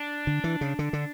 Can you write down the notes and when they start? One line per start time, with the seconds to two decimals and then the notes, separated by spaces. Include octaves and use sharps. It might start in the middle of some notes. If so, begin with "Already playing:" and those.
Already playing: D4
0.27 D3
0.44 E3
0.61 C#3
0.79 D3
0.93 D3